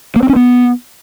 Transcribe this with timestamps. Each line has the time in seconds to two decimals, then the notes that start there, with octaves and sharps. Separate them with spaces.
0.16 A#3
0.23 C4
0.29 C#4
0.36 B3